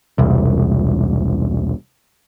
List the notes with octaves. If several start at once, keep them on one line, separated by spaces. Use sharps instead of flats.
E1 C2